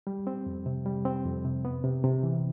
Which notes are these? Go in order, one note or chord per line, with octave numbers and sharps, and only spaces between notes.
G3
C4
F2
C3
G3
C4
F2
C3
B3
C3
C3
E3